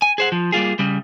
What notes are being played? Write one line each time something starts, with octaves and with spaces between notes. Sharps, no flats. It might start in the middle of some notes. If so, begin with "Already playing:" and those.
G#5
G#4 C5 F#5
F3
G3 A#3 F4 G#4
C#3 G3